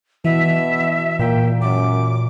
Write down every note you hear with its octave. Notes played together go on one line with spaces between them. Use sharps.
B2 E3 E5
A#2 A#3 G5
F#2 D6